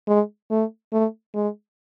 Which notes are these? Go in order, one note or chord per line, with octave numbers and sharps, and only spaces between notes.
G#3
A3
A3
G#3